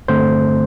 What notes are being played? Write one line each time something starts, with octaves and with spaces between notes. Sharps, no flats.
G2 D3 A3 C4 C5